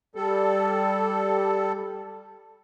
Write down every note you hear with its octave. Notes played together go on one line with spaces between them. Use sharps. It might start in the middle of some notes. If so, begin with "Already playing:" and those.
G3 A4